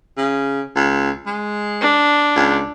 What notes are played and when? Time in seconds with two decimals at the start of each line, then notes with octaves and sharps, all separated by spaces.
0.17 C#3
0.76 C#2
1.26 G#3
1.81 D4
2.36 C#2